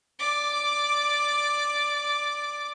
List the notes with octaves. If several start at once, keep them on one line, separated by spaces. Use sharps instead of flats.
D5 D6